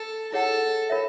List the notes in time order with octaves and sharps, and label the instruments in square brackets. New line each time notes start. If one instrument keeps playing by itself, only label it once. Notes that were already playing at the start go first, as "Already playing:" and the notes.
Already playing: [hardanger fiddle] A4
[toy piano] E4 G#4 C#5 F#5 [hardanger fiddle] A4
[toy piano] F4 A#4 C#5 E5